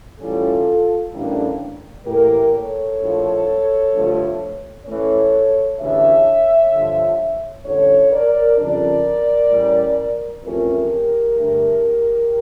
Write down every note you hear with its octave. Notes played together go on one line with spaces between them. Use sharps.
A2 E3 G3 C#4 F4 A4
A1 A2 G3 A#3 D4
A2 E3 A#3 G4 A#4
A4 C#5
A#1 A2 F3
G1 G2 F3 A3
A2 E3 A3 C#4 A4 C#5
D2 C#3 E3 G3 D4 C#5 E5
G2 D3 F3
A1 G2 D3 A4 C#5
A#4 D5
F2 C#3 G3 D4 A#4 D5
A2 G3 C#4
F2 E3 A3 C#4 G4 A#4
G2 D3 A3